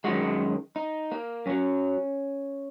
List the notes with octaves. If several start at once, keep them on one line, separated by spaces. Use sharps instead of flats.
F#2 D#3 G#3 F#4
D#4
A#3
F#2 F#3 C#4